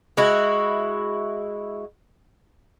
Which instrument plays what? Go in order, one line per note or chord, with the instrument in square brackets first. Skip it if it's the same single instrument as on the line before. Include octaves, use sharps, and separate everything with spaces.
[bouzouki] G#3 E4 F#4